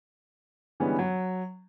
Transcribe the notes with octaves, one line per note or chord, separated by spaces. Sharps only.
D3 E3 G3 G#3 B3 C#4
F#3